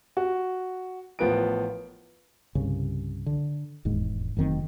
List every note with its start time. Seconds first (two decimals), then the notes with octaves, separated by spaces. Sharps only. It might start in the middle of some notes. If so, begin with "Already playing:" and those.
0.17 F#4
1.19 A1 F3 B3 A#4 B4 D7
2.55 C2 G2 C#3
3.26 D3
3.85 E1 D#2 G#2
4.37 F1 F#2 D#3 C4